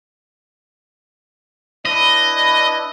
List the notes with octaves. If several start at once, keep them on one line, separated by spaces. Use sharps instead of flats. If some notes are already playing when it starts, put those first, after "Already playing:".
D4 E4 B4 D#5